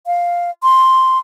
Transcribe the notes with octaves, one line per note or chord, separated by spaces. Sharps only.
F5
C6